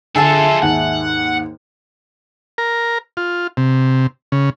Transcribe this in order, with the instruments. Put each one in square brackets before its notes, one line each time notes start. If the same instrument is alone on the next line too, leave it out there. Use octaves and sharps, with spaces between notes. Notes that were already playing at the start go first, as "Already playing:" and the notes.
[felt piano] D3 [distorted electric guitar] F4 A4 [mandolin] G#4 E5 A5
[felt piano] D#2 G#2 [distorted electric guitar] F#5
[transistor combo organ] A#4
F4
C3
C#3